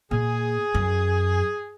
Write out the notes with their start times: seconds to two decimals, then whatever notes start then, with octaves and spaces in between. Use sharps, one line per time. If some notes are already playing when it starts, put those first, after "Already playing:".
0.11 A#2 G#4
0.75 F#2